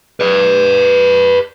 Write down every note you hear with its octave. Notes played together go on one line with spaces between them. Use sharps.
B4 D5